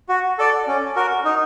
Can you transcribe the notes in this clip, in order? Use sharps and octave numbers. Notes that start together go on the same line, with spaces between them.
F#4
A4 D5
C#4
F#4 A#4
D#4